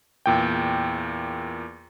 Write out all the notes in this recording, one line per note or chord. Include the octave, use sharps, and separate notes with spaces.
E2 A#2 G5